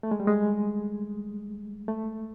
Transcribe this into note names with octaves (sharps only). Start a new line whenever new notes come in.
A3
G#3
G3
G#3
A3